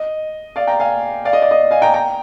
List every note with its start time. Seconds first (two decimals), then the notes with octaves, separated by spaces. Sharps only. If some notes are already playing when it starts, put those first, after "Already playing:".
Already playing: D#5
0.56 D5 F5
0.67 G5 A#5
0.80 F5 G#5
1.25 D5 F5
1.33 D#5
1.42 D5
1.51 D#5
1.71 F5 G#5
1.82 G5 A#5
1.94 G5 A#5